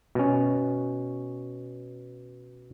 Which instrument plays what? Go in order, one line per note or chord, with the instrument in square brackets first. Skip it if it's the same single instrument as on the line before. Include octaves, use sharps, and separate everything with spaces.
[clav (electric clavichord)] B2 C#4